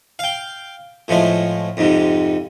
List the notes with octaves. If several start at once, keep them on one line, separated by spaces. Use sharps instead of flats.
F5 G5
A2 F3 G#3 A3
F2 G#2 C3